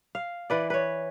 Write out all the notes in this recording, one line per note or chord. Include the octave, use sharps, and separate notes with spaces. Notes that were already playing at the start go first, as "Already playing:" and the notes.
F5
E3 B4 D5
B4 C#5